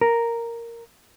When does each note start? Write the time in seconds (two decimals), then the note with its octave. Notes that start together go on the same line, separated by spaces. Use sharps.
0.01 A#4